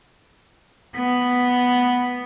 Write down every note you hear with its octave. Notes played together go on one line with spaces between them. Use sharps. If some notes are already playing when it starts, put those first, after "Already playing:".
B3